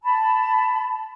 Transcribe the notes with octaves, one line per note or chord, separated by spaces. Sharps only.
A5 B5